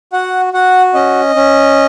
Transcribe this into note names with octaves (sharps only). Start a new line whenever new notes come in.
F#4 F#5
F#4 F#5
C#4 D#5
C#4